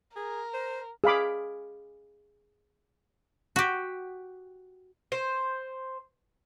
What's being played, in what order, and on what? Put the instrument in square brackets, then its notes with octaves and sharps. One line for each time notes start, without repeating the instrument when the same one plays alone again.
[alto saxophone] G#4 [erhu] A#4
[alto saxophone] C5
[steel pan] G#4 F5 B5 D6
[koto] F#4 G4
[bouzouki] C5